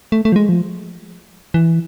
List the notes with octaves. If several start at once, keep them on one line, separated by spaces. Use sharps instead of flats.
A3
A3
F3
G#3
F3
E3